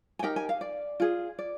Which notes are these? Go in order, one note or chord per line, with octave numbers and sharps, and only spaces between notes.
G#5
D#4 G4 A#4 G5
G#5
F5
D5
F4 G#4
D5